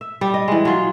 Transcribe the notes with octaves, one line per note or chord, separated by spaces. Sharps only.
E5
G3
D#5
E3 G#3
F#3 F4